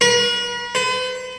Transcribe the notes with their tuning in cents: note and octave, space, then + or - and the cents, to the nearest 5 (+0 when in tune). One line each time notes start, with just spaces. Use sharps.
B4 -45
B4 +45